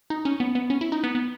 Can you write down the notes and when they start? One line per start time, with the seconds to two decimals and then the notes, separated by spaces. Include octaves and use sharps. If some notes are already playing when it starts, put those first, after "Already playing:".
0.10 D#4
0.25 C#4
0.40 B3
0.55 B3
0.70 C#4
0.81 E4
0.92 D#4
1.03 B3
1.15 B3